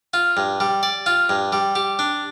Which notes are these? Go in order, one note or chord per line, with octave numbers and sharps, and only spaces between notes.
F4
G2
G3
D5
F4
G2
G3
G4
D4